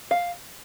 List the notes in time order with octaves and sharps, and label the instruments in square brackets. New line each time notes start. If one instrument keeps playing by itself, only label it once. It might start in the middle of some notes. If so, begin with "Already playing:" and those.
[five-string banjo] F5